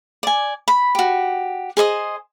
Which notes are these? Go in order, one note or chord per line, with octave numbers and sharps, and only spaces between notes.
D5 G#5
B5
F#4 G4
G#4 C5 D#5 D#6